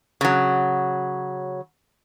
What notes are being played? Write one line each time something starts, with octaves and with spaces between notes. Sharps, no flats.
C#3 F#3